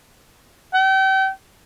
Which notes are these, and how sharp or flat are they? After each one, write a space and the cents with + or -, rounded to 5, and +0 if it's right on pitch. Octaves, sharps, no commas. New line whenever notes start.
G5 -35